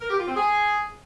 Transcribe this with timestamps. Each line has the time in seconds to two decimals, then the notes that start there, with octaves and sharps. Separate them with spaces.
0.01 A#4
0.10 G4
0.19 F4
0.27 C4
0.36 G#4